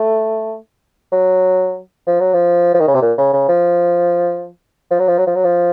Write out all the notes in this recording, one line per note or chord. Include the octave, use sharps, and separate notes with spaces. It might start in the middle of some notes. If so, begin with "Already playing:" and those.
Already playing: A3
F#3
F3
F#3
F3
F3
D#3
C#3
C3
A#2
C#3
C#3
F3
F3
F#3
F3
F#3
F3
F#3
F3